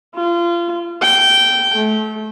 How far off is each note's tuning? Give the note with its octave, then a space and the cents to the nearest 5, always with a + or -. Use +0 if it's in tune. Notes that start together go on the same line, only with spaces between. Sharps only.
F4 -30
G5 -15
A3 -30